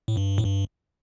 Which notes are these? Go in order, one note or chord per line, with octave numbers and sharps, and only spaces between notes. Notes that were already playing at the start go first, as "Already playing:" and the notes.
A2
G2
A2
G2